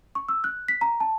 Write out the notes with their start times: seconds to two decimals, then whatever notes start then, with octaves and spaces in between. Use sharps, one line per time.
0.15 C#6
0.29 E6
0.44 F#6
0.68 B6
0.81 A#5
1.00 A5